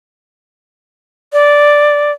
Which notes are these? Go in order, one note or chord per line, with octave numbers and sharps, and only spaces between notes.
D5